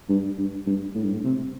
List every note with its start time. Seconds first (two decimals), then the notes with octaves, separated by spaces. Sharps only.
0.09 G2
0.38 G2
0.66 G2
0.94 A2
1.04 G2
1.13 A2
1.24 C3